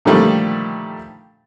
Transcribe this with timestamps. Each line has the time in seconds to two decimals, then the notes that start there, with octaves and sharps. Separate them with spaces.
0.05 A#2 D3 D#3 F3 G3 A3